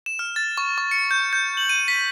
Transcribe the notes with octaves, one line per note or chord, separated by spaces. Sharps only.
E7
F6
A6
C#6
C#6
C#7
G6
G6
F#7
D#7
B6